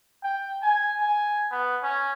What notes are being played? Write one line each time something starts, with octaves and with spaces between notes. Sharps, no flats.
G5
G#5
G#5
B3
C#4